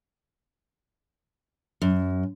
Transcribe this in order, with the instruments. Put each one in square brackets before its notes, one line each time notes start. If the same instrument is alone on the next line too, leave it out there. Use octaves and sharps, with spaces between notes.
[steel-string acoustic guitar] F#2